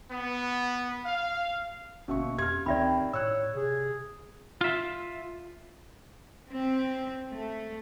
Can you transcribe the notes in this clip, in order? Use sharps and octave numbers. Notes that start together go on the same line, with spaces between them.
B3
F5
G1 B2 A#3 C#4 E5 C#6
F2 G4 F6 G#6
C#2 D#3 C4 D5 E5 B5
A2 C#5 E6 F#6
C3 G#4
F4 E5
C4
A3